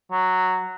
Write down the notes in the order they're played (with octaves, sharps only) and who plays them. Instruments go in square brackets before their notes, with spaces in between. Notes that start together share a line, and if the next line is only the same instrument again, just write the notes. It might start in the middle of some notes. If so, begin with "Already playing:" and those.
[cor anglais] F#3